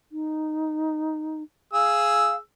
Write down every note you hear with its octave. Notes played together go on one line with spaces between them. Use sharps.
D#4
G#4 F5 E6